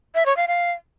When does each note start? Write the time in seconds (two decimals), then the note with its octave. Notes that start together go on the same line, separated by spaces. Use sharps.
0.15 E5
0.26 C#5
0.37 F5
0.48 F5